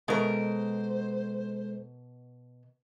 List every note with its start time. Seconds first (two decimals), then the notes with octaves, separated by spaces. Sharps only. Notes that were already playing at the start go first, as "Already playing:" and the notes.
0.08 B2 G#3 A4 A#4 C5